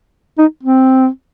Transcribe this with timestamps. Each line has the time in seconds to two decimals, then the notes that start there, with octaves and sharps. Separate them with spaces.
0.38 D#4
0.63 C4